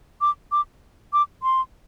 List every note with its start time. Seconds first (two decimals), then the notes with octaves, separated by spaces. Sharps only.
0.21 D6
0.52 D6
1.13 D6
1.43 C6